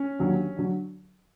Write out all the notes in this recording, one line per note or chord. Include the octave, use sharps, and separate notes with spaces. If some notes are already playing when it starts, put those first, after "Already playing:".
Already playing: C#4
D#2 D3 F#3
D3 F#3